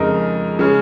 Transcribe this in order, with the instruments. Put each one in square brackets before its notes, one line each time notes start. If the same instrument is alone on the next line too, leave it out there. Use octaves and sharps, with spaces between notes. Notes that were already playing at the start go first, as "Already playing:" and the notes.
Already playing: [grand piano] F2 C#3 G#3 D#4 A#4
C#3 G#3 C#4